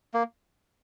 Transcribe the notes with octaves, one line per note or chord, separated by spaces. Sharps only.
A#3